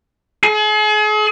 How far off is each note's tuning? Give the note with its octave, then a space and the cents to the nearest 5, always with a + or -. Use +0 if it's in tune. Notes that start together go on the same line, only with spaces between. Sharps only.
G#4 +40